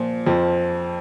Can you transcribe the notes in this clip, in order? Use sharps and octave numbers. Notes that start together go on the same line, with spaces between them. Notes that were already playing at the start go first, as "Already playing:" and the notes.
Already playing: A#2 F3
F2 F3